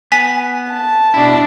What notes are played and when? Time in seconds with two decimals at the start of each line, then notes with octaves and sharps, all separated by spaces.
0.12 B3 G#5 B6
0.71 A5
1.14 B2 D4 E4